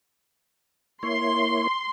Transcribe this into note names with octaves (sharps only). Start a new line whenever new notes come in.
A#3 E4 C#5 C6